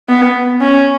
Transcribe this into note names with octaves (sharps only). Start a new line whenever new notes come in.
B3
C#4